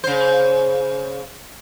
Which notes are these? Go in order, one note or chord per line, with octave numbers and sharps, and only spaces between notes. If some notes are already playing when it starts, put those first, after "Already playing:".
C#3 C5